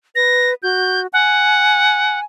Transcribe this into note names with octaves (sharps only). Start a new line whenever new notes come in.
B4 A#6
F#4 G6
F#5 G#5